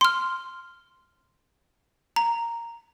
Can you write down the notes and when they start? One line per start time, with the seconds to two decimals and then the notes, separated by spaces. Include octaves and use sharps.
0.01 C6 F6
2.16 A#5